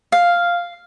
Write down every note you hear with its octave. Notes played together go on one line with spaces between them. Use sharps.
F5